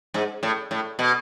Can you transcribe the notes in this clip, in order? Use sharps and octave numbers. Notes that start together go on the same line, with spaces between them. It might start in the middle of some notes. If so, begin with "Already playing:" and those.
G#2
A2
A2
B2